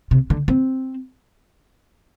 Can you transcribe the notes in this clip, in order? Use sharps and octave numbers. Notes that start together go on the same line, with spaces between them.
C3
D3
C4